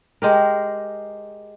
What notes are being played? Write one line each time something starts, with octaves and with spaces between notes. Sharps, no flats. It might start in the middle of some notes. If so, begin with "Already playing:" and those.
G#3 G4 A#4